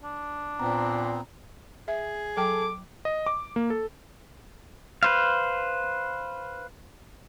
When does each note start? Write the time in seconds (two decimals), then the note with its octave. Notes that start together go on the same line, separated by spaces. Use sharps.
0.03 D4
0.60 A#2 B3 C4 A#5
1.88 G#4 E5
2.37 F#3 A4 G5 A5 D6
3.05 D#5
3.26 D6
3.56 A#3
3.70 A4
5.03 B4 C5 F5